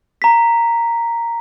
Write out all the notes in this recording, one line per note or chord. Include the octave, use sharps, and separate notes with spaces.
A#5 B6